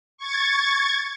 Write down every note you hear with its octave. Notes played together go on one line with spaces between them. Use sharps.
C#6 G#6 A6